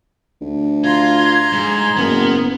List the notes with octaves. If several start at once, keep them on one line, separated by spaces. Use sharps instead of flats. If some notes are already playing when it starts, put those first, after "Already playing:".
D2
F4 A#5 C6 G#6
G#2
F#1 B3 A#4